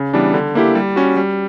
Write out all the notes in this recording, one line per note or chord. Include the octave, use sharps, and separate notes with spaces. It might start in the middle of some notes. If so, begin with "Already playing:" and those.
Already playing: C#3
E3 G3 B3 D4
D3
A#3 E4 G4
G3
C#4 F#4
G3